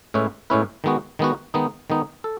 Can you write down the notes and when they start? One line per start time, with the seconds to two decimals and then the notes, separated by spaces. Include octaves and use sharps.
0.14 A2 G#3 C#4 E4 B4
0.50 A2 G#3 C#4 E4 B4
0.84 D#3 G#3 B3 F#4
1.19 D#3 G#3 B3 F#4
1.54 D#3 G#3 B3 D#4
1.90 D#3 G#3 B3 D#4
2.24 A4